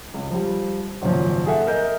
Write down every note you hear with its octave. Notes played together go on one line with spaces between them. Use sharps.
C#2
F3 G3
G#1 F#2 A#2 C#3 F3
G#4 A4 E5 F#5
A#4 D#5 E5 G6